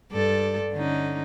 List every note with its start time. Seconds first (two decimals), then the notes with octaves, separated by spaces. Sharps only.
0.12 G2 A4 D5
0.74 D3 C#4 D#4